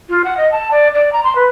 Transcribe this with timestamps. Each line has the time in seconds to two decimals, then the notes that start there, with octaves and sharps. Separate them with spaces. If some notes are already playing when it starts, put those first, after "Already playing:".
0.09 F4
0.24 F#5
0.37 D#5
0.52 A5
0.71 D5
0.94 D5
1.13 A#5
1.24 C6
1.35 B4